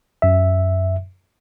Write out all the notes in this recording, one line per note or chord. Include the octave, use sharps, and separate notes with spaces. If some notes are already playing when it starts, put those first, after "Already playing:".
F#2 E5